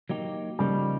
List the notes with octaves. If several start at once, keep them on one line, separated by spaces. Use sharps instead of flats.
F#3 A#3 D#4 G4
C#3 F3 G3 A#3 D#4